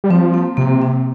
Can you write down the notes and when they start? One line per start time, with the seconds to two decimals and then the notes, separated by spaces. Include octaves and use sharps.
0.04 G3
0.10 F3 C4
0.34 A#3
0.57 C3 A#3
0.82 C4